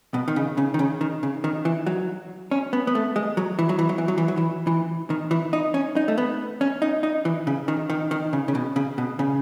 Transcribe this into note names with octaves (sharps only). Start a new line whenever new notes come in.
B2
D#3
C#3
C#3
D#3
C#3
D#3
C#3
D#3
E3
F#3
C#4
B3
B3
A3
G#3
F#3
E3
F#3
E3
F#3
E3
F#3
E3
F#3
E3
E3
D#3
E3
D#4
C#4
D#4
A3
B3
C#4
D#4
D#4
E3
C#3
D#3
D#3
D#3
C#3
C#3
B2
C#3
B2
C#3